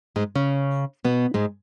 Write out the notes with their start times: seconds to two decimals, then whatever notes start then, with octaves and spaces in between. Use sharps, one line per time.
0.16 G#2 G#3
0.35 C#3 C#4
1.05 B2 B3
1.34 G#2 G#3